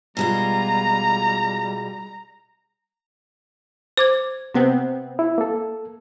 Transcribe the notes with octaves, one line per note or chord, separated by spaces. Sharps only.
B2 G3 G#3 F4 A#5
C5 D6 G#6
C3 B3 C4
E4
A#3 A4